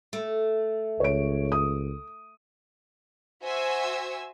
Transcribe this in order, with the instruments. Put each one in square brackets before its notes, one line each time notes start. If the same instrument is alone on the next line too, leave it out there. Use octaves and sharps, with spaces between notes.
[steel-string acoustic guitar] A3
[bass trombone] C#2 [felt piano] C#5 D7
[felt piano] D#6
[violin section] F#4 C5 E5 G#5 E6